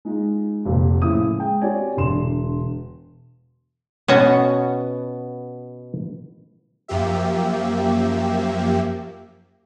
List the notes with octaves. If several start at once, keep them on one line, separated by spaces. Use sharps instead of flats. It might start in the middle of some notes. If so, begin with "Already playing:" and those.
G#3 D#4 F4
F1 F2 A#2
A2 C#3 F3 E4 D#6
G#3 G5
C4 F#4 G4 C#5 D5 G#5
E1 D3 C6 E7
B2 B3 C#4 F#4
F#2 F3 A#3 G4 E5